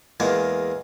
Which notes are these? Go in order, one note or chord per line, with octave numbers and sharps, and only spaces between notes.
E2 G#3 A#3